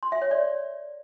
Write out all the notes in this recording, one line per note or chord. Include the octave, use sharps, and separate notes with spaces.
C6
E5
C#5
D5